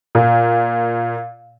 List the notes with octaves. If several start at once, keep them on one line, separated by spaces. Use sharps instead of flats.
A#2